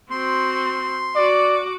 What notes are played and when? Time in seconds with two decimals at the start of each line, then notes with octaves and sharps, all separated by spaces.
0.11 C4 F#4 C6
1.16 F#4 D5 D6